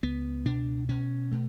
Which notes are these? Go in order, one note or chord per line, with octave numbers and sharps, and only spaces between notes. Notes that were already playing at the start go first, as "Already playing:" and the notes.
C#2 B3
B2 D4
B2 C#4
B2 A3